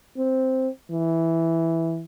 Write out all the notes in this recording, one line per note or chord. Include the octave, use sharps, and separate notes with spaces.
C4
E3